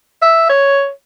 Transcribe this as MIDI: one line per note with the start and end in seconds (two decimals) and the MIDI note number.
0.22 0.45 76
0.49 0.90 73